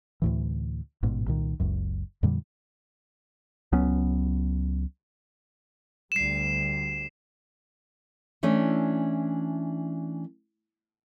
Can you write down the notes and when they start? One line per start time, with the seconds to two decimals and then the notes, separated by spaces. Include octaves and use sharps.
0.22 D2 A2 E3
1.03 A1 G#2 B2
1.27 C2 A#2 D#3
1.60 F#1 C#2 F#2
2.23 F2 A#2 D3 G3
3.72 C#2 F#3 B3 C#4
6.12 D2 G3 C7 E7
8.43 E3 A3 C#4 D4